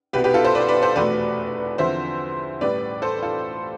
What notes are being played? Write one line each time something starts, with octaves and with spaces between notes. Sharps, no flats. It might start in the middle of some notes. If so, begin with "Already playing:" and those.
C2 B2 B3 G4 B4
G4 B4
F4 A4
A4 C5
B4 D5
B4 D5
A4 C5
F1 E2 B2 A3 B4 D5
E2 D3 F3 C4 C5 E5
A1 A2 G3 B4 D5
A4 C5
F4 A4